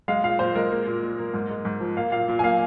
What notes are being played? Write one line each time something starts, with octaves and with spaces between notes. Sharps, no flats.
G#3 F5
A#2 F5
A#2 C5
G#3 A#4
A#3
A#2
A#2
A#3
G#2
G#3
G#2
F3
A#3 F5
A#2 F5
A#2
G#5
A#3 F5